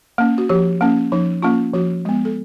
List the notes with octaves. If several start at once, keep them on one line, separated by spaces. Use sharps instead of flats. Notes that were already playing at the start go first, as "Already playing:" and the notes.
A#3 C#4
F#4
F3 G4
A#3 C#4
F3 D#4
A#3 C#4 F4
F3 F#4
G#3 B3
A4